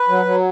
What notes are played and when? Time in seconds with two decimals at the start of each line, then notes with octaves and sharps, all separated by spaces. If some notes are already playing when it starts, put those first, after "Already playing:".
Already playing: B4
0.08 F#3
0.25 F#3